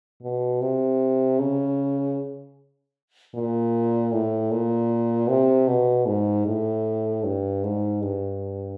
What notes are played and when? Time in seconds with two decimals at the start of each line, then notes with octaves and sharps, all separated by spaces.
0.22 B2
0.61 C3
1.39 C#3
3.35 A#2
4.12 A2
4.51 A#2
5.29 C3
5.68 B2
6.07 G#2
6.46 A2
7.24 G2
7.64 G#2
8.02 G2